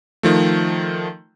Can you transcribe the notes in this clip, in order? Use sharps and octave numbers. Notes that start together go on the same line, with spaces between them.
D#3 F3 A3